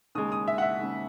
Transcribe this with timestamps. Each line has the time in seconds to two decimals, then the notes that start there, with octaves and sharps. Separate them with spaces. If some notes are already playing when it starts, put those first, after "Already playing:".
0.15 D#2 C#3 G#3 D#6
0.32 D#6
0.48 E5
0.58 F#5
0.62 E5
0.78 D#2 C#3 G#3